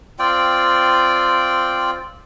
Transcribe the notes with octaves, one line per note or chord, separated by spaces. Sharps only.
C4 F4 D5 G5